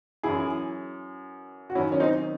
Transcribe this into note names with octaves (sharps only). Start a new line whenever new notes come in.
F#2 E3 E4 G#4
F#4
F#2 D#3 F#3 C#4 E4
C#4
C4 D#4